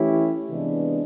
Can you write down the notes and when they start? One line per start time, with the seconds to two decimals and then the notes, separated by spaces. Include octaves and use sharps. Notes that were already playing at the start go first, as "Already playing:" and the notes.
Already playing: E3 A3 C#4 E4 G4
0.49 C3 E3 G#3 B3 D4